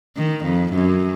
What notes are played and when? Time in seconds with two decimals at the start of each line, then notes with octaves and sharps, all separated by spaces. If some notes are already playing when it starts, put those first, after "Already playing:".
0.17 D#3
0.45 F2
0.74 F#2